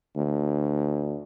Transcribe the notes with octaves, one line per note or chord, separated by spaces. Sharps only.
D2